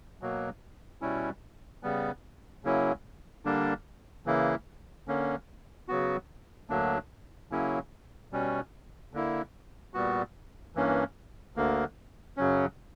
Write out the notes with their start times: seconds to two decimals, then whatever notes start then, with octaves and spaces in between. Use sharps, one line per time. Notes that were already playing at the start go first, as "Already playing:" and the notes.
0.21 B2 F#3 A#3
1.01 B2 G3 C#4 E4
1.83 C#3 G3 B3
2.64 C#3 F#3 A#3 C#4 E4
3.45 D3 G3 A#3 D4
4.26 C#3 E3 A#3 E4
5.08 D3 A#3 C#4
5.88 C#3 F#3 B3 F#4
6.70 D2 D3 F#3 A#3 D4
7.51 C#3 F#3 A#3 C#4 E4
8.32 B2 G3 C#4
9.13 D3 A#3 E4
9.94 A#2 G3 B3 F#4
10.75 G2 E3 A#3 C#4
11.56 D2 D3 A#3
12.37 F#2 C#3 F#3 C#4